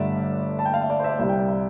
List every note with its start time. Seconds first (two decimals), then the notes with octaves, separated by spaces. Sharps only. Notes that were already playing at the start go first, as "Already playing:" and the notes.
Already playing: G1 G2 D3 A3 D5 E5
0.59 A5
0.65 G5
0.74 F5
0.81 E5
0.90 D5
0.99 C5 E5
1.09 D5
1.19 C2 C3 G3 E5
1.29 G5
1.39 D5
1.49 E5